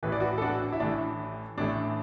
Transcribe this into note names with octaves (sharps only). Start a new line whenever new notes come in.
A1 A2 E3 A3 B4
D5
F#4 B4
A4
D4 F#4
E4
A1 A2 E3 A3 D4
A1 A2 E3 A3 D4